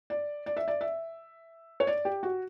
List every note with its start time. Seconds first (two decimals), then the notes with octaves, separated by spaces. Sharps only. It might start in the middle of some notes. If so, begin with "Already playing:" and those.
0.10 D5
0.46 D5
0.57 E5
0.68 D5
0.81 E5
1.80 C#5
1.87 D5
2.05 G4
2.23 F#4